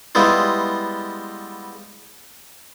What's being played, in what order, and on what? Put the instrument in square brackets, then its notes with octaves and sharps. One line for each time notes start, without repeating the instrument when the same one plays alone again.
[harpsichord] G3 G#3 B3 E4 F4